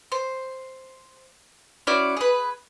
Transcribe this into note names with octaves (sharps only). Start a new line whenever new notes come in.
C5
C#4 E4 F#4 D5
G#4 B4